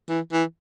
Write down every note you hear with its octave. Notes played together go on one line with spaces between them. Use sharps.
E3
E3